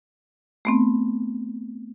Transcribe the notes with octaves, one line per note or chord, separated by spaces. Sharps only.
A3 B3 C4